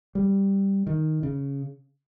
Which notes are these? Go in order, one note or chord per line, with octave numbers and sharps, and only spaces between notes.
G3
D#3
C#3